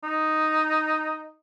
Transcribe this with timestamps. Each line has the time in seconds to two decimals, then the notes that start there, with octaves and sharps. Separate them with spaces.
0.04 D#4